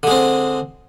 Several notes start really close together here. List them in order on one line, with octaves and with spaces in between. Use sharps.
D3 G#3 C4